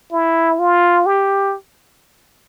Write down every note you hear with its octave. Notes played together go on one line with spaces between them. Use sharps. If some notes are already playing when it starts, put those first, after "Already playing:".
E4
F4
G4